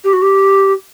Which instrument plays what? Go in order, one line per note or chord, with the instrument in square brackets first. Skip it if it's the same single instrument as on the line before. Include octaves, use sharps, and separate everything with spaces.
[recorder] G4
F#4
G4